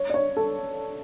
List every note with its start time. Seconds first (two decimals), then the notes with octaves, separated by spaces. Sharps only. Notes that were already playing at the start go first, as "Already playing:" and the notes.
Already playing: C#5
0.10 D5
0.14 C#5
0.37 A4